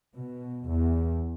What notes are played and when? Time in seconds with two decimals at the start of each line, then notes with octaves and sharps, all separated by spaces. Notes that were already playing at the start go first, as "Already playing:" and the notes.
0.15 B2
0.68 E2